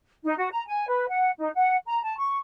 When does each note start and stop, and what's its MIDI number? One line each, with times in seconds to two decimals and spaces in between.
0.24 0.35 63
0.38 0.49 66
0.51 0.66 82
0.67 0.85 80
0.88 1.06 71
1.09 1.31 78
1.39 1.49 63
1.54 1.77 78
1.87 2.01 82
2.03 2.17 81
2.18 2.37 85